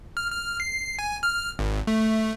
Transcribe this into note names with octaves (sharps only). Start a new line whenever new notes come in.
F6
F6
C7
G#5
F6
G#1
A3